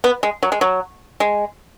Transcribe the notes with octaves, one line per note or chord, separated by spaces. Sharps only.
B3
G#3
F#3
G#3
F#3
G#3